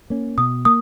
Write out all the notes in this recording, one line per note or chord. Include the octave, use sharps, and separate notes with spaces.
A#3 C#4
B2 D#6
A#3 D#6